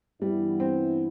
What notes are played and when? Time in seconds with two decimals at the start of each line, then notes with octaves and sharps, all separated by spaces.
0.21 G2 E3 G3 B3 E4
0.60 C4